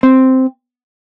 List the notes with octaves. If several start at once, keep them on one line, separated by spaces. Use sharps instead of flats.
C4